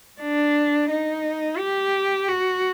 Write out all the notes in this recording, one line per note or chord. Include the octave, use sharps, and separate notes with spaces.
D4
D#4
G4
F#4